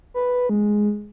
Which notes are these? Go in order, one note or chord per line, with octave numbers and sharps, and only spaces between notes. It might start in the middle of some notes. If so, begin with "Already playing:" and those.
B4
G#3